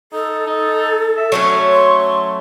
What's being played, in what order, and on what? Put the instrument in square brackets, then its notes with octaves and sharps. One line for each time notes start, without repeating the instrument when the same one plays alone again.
[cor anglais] D#4 [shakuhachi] A4
[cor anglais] D#4
E5
[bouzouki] F#3 A3 C#4 [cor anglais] C#5
[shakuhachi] C6